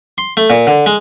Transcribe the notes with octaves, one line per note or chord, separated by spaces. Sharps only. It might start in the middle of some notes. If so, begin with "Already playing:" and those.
C6
A3
A#2
D3
G#3